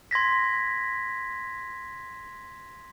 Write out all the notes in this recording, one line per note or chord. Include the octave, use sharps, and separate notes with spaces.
C6 G#6 A#6 B6